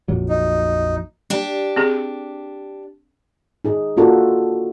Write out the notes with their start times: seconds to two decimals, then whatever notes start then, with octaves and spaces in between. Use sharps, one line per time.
0.08 A#1 F2 F#3
0.29 D#4
1.30 D4 G4
1.76 C4 G#4
3.64 D#4 G#4
3.97 A#3 D4 F4 F#4 A4 A#4